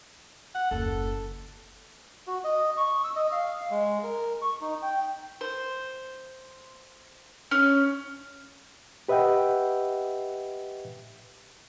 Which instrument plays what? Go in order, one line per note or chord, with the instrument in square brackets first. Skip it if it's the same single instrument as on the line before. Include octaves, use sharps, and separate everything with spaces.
[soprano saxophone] F#5
[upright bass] F#1 D#2 [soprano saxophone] A4
[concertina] F#4
D#5
C#6
E6
D#5
F5
G#3
A#4
C#6
D#4
G5
[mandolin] C5
C#4
[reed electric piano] G4 B4 D#5 E5 F#5 G5